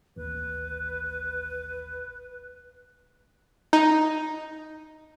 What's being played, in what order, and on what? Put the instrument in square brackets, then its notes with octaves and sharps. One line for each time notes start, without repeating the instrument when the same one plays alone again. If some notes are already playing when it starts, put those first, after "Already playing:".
[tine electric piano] A1 D#2 [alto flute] B4
[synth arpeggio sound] D#4